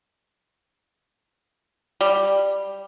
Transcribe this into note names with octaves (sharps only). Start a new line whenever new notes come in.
G3